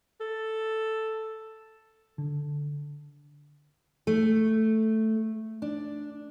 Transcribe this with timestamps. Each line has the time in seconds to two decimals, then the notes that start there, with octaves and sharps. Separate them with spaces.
0.21 A4
2.18 D3
4.07 A3
5.62 D4